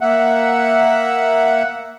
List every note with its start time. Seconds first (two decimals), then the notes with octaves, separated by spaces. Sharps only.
0.01 A#3 E5 F#5